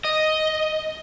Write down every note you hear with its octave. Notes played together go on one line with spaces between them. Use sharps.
D#5